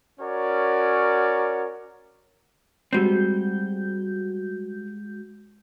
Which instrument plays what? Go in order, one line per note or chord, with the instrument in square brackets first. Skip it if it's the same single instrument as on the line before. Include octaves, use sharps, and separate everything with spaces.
[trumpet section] C#4 F#4 A#4 C#5 D5
[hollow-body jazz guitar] G3 C4 [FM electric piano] G#3 F#4 G6